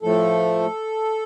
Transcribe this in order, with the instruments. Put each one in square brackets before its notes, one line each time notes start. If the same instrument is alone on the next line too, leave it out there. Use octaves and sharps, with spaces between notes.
[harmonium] A2 F3 A3 A4